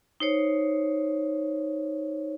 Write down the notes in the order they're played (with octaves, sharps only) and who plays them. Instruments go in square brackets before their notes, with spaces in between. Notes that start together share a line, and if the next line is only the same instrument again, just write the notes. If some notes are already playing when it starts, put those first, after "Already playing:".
[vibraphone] D#4 C5 C#5